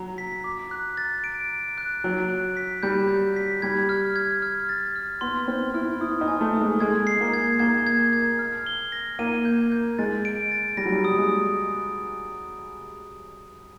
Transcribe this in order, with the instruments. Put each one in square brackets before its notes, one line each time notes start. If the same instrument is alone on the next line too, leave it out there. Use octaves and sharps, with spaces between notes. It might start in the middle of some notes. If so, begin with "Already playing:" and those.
Already playing: [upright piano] F#3 [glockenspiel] A#5
[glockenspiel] B6
D6
F#6
A6
D7
D7
F#6
[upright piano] F#3 [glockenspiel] D7
[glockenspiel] F#6
B6
[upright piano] G3 [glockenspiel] G6
[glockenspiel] G6
B6
[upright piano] G3 [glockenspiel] G#6
[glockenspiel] F6
G#6
F6
A6
F6
[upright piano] B3 [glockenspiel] C6
[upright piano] C4 [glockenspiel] F6
[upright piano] E4 [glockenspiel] F6
[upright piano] E4 [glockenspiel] D#6
[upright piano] D#4
[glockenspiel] G#5
[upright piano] A3
[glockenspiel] D#6
[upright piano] G#3
[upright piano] G#3 [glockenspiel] G#6
[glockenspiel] C7
[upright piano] A#3
[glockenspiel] G#6
[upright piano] A#3 [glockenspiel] G#6
[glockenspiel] G#6
G#6
F6
G7
A#6
[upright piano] A#3 [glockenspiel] D#7
[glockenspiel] G6
G6
[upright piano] G#3 [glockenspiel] A6
[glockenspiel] D7
A6
[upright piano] G3 [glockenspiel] A#6
[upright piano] F#3
G3
[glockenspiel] D#6
[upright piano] G#3